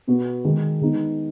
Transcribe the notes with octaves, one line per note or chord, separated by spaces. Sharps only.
B2 B3 F#4
D#3 G#3 D#4 G#4
D#3 G#3 B3 D#4